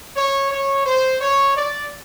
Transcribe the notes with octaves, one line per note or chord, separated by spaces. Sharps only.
C#5
C#5
C5
C#5
D5